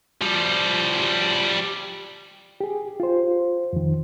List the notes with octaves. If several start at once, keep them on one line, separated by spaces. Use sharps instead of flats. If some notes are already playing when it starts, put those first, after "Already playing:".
F3 G3
G4 G#4
F4 C5
F2 D#3